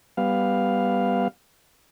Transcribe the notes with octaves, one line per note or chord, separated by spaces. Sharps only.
G3 B3 F5